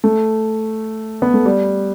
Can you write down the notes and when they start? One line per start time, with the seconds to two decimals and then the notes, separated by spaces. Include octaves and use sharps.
0.04 A3
1.22 B3
1.34 A3
1.45 G3